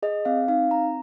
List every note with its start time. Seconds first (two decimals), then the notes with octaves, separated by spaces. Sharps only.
0.03 G#4 D#5
0.25 C4 F5
0.48 D#4 F5
0.71 C4 A#5